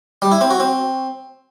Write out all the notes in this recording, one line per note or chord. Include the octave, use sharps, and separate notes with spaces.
G3
E4
C4
F#4
C4